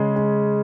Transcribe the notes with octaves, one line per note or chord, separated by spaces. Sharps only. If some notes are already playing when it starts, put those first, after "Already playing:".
Already playing: C#3 G#3
G#3